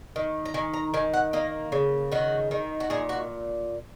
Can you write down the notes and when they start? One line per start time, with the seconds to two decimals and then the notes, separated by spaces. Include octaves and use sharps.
0.16 D#3
0.46 A#5
0.54 D#3 G#5
0.74 A#5
0.94 D#3 G#5
1.14 F#5
1.33 A#3 D#5
1.72 C#3
2.12 D#3 F#4
2.51 D#3
2.80 F#4
2.90 A#2 G#4
3.09 F#4